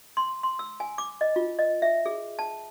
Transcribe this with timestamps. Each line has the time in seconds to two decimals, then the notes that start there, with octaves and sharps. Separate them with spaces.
0.17 C6
0.43 C6
0.59 E6
0.80 G#5
0.98 D6
1.21 D#5
1.36 F4
1.59 D#5
1.82 E5
2.06 G#4
2.39 A5